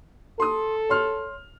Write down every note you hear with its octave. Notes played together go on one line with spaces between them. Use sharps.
A4 C6 D#6
C#5 C6 F6